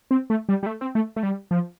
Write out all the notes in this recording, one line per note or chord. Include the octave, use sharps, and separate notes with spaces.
C4
A3
G3
G3
A3
C4
A3
A3
G3
F3